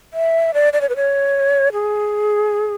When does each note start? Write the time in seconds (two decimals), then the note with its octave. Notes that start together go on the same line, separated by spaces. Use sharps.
0.13 E5
0.54 D5
0.73 D5
0.81 C#5
0.89 B4
0.96 C#5
1.73 G#4